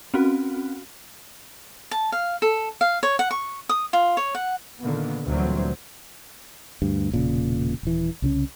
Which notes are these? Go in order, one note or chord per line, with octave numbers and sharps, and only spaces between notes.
C4 C#4 F#4
A5
F5
A4
F5
C#5
F#5
C#6
D#6
F4
C#5
F#5
A#2 D3 D#3 A#3 B3
D2 A#2 E3 F#3 G3 C4
D2 G2
E1 A#2 C#3
D#1 E3
C2 C#3 C#4